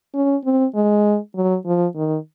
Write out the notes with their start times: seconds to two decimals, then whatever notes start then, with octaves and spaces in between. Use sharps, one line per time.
0.14 C#4
0.45 C4
0.75 G#3
1.35 F#3
1.65 F3
1.95 D#3